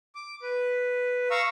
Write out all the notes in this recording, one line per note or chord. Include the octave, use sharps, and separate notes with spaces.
D6
B4
F5 A#5 C#6 E6